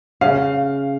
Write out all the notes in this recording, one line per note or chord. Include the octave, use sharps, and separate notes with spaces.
C#3 F5